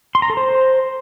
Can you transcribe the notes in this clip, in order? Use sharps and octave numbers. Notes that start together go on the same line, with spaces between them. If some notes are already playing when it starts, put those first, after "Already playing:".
C6
A#5
A4
C5